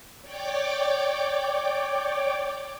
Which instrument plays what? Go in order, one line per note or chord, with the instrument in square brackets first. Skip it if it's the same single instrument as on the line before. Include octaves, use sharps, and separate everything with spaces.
[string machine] C#5 D5 G5 D6